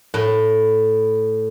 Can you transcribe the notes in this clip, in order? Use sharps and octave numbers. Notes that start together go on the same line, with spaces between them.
A2